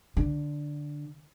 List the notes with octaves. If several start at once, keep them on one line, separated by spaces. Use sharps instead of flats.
D3